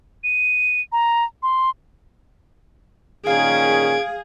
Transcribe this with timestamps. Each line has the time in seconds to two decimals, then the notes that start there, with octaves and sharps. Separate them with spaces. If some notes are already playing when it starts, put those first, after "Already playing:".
0.24 D#7
0.92 A#5
1.43 C6
3.27 A#2 D#3 C#4 G#4 F5 G#6 D7